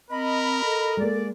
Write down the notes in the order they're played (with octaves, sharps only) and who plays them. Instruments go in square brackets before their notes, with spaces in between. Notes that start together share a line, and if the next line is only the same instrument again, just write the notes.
[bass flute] C4 [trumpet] A#4 [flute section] D#5 B5
[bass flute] A4
[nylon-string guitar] G#3 A#3 [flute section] D5